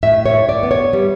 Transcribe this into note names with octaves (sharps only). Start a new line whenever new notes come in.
A2 E5
C#5
A2
D5
B3
C#5
G3